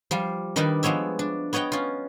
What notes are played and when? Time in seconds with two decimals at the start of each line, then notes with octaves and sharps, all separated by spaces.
0.11 F3 G3 F4
0.56 D#3 G3 D4 D#4 A#4 B4
0.83 F3 G#3 B3 C#5 E5
1.19 D4
1.53 B3 C#5 D#5 F#5 G5
1.72 C#4 F4